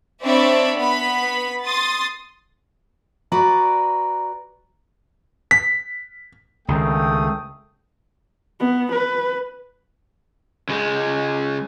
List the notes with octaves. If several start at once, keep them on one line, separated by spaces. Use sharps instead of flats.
C4 D4 C#5 D5 E5 B5
B3 B5
C6 D#6 A6
F#4 B4 D5 A#5 C#6
B6
C#2 D#3 A3 G5 D#6
B3
B4
C#2 G#3